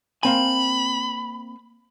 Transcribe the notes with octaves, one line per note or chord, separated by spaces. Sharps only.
A#3 C4 G#5 B5